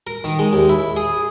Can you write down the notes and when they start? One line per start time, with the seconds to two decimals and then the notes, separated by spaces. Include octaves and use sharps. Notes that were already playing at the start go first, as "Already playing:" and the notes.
0.07 A#4
0.24 D#3
0.39 G#3
0.53 D#2
0.69 E4
0.96 G#4